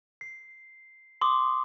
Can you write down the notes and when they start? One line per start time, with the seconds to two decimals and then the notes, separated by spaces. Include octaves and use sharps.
0.21 C7
1.21 C6 D6 D#6